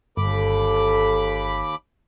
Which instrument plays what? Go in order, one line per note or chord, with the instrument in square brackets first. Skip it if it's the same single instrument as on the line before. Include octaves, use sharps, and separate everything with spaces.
[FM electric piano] G1 [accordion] D#2 B5 D6 [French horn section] A4